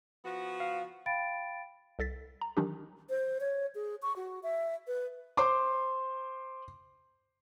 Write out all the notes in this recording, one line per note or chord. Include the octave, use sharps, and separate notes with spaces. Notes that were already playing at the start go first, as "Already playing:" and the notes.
F3 B3 F#4
F5
F5 G5 B5 A6 D7
C2 A4 A6 B6
A#5
D#3 E3 F#3 D4 D#4 G4
C5
C#5
G#4
C#6
F#4
E5
B4
C5 C6 D6